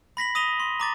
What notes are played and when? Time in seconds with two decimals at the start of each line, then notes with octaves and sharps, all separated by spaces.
0.17 B5 A#6 B6 F#7
0.35 D#6 A#6 D#7 F7 G7
0.60 C6
0.80 A#5 D6 A6